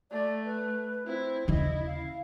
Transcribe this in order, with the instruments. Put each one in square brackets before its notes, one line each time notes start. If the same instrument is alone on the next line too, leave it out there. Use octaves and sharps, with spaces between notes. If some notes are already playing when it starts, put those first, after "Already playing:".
[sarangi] A3 [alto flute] D5
[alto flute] B4
[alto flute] C4 [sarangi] E4
[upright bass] D#2 C#3 [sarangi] E4 [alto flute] D#5
[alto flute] F5